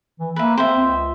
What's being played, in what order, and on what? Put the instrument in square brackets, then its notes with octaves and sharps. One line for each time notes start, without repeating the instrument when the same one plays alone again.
[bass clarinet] E3
[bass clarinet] A#3 [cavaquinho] B4 E5
[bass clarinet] C4 [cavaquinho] C5 E5
[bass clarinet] C#2